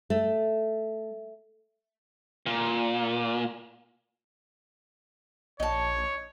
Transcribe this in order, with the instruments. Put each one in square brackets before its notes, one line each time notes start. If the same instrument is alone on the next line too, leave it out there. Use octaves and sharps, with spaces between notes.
[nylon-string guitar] A3
[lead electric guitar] A#2
[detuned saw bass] A#1 [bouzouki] D#4 A5 [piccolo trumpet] C#5